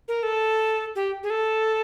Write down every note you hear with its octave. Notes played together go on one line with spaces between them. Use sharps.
A#4
A4
G4
G#4
A4